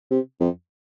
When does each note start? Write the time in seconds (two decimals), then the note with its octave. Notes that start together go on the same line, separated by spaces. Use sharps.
0.11 C3
0.40 F2